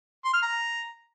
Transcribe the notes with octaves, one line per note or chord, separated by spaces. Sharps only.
C6
F6
A#5